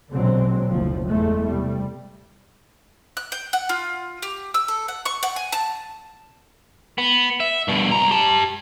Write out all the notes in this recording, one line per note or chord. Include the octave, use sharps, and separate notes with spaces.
A#1 B2 D3 F#3 G#3 C4
F#1 D2 F3
E2 G#2 G#3 A3
C3 G3
F#6
G5
F#5
F4
G4
E6
A4
F#5
C#6
F#5
G#5
A5
B3
E5
G2 B2
C2 A#5
G4 A5